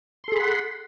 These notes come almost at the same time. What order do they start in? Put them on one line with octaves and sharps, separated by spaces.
C6 A4 G#4 B5 F#5